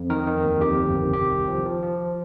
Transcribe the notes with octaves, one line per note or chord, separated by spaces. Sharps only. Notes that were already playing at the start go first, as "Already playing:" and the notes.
Already playing: F2
D#3 A#4
D#3
D#2
F2 G4
G1
D#3
C3 G4
C2
F3
F3
F3